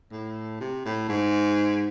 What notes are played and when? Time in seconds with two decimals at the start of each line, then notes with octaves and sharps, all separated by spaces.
0.12 A2
0.61 C3
0.85 A2
1.09 G#2